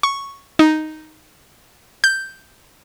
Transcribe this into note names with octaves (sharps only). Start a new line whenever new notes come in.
C#6
D#4
G6